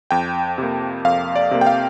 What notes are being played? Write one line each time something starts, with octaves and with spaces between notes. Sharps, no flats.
F2 G5
C3 A#3
F2 F5
D5
C3 A#3
G5
F5